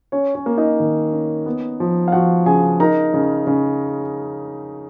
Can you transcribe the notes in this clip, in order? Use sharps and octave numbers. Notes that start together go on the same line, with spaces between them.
C#4 C#5
C#4 C#5
A#3
D#4 D#5
D#3
C#4
B3
F3
F5
F3 F#4 F#5
C#3 G#4 G#5
D#4 A#4 A#5
C#3
C#3